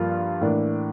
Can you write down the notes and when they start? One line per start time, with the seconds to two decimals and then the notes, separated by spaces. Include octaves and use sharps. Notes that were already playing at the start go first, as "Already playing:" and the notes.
Already playing: G2 F3 A#3 F4
0.41 A2 E3 A#3 D4